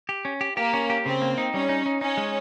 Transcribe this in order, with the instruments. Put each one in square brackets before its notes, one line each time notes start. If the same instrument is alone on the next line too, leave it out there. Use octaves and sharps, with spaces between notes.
[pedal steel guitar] G4
C#4
G4
[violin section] A#3 [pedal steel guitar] G4
[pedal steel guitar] C#4
G4
[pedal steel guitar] C#3 [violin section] C4
[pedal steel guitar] A#3
D#4
[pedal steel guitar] G3 [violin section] C#4
[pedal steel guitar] D#4
D#4
[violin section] C#4 [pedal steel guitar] D#4
[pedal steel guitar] G#3